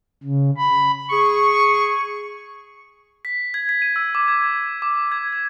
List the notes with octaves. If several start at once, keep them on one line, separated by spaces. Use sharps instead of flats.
C#3
B5
G#4 C#6
B6
G#6
B6
D#7
E6
D6
G#6
D6
G#6
G#6